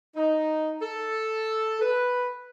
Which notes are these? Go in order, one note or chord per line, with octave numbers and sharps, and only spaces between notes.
D#4
A4
B4